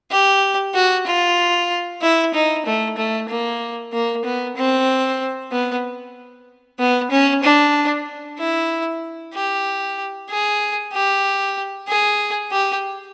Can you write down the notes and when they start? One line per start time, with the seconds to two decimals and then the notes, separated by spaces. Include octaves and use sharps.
0.11 G4
0.75 F#4
1.06 F4
2.02 E4
2.34 D#4
2.65 A3
2.97 A3
3.29 A#3
3.93 A#3
4.24 B3
4.56 C4
5.51 B3
6.79 B3
7.11 C#4
7.43 D4
8.38 E4
9.34 G4
10.29 G#4
10.92 G4
11.88 G#4
12.52 G4